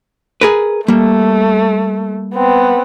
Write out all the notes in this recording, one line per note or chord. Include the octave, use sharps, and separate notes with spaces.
G#4 A#4 B4
G3 A3 A#3
B3 C4